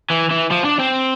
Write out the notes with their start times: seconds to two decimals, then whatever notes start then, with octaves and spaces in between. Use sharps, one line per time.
0.10 E3
0.31 E3
0.52 F3
0.65 D4
0.80 C4